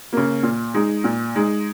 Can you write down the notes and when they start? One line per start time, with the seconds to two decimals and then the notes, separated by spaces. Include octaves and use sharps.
0.13 C#3 A#3
0.43 A#2
0.74 G#3 D#4
1.04 A#2
1.36 G#3 D#4